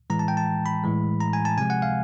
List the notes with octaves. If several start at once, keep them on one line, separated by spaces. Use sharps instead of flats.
A2 E3 G#3 A#5
A5
G5
A5
B5
A2 E3 G#3
A#5
G#5
A5
C3 F3 G#3 G#5
F#5
F5